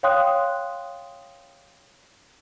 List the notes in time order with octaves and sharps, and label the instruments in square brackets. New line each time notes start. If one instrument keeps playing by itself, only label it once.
[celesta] C#5 F5 G5 C6 D#6 F#6